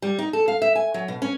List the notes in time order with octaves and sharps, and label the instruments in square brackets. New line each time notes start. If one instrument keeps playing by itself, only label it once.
[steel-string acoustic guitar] G3
D#4
A4
F5
E5
G#5
F#3
B2
C#4